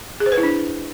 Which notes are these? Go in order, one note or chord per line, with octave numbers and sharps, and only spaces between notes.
G#4
C5
B4
E4
D4